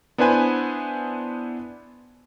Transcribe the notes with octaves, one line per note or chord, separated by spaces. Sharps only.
B3 D4 E4 B4 C5 G#5